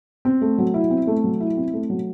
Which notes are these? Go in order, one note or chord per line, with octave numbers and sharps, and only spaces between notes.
C4
A3
F#3
E4
C4
A3
F#3
E4
C4
A3
F#3